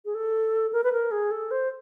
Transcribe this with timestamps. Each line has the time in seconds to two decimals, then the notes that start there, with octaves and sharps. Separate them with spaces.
0.05 G#4
0.15 A4
0.73 A#4
0.84 B4
0.92 A#4
1.11 G#4
1.31 A4
1.51 C5